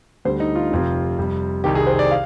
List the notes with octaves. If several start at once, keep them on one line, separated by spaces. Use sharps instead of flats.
D2 D3 G3 C5
D#4
F4
F1 F2 C3
F2 C3 G3
C2 C3 D#3 G3 G4
G#4
C5
D5
F5